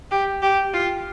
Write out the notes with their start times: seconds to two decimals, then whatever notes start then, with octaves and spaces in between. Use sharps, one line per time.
0.11 G4
0.42 G4
0.73 F4